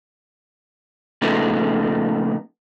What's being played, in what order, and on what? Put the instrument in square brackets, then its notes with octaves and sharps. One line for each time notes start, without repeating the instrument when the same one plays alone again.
[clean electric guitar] A#2 C#3 F3 A3 B3 D#4